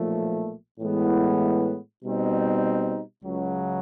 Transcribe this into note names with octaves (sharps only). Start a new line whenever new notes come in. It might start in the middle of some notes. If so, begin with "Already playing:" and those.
Already playing: B1 A#2 F3 A3
A2 E3 G#3 B3 E4
B2 G3 C4 D#4
C#2 C#3 F#3